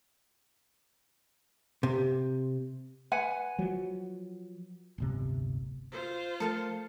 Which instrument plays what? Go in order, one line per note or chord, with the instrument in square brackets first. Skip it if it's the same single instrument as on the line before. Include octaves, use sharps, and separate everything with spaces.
[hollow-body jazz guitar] C3
[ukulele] B4 F#5 G#5
[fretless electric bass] F3 F#3
D1 G1 C3
[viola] F4 C5
[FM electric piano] F3 A3 A#4 [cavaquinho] A4 F5 A5